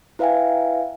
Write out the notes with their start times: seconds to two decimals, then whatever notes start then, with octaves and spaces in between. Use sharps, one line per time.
0.19 E4 B4 E5 F5 G5 G#5